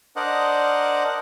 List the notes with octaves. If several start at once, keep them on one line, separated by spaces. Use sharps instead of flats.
D4 A#4 C5 D5 D#5 F#5